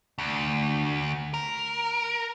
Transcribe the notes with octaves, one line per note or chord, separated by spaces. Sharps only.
D2
A#4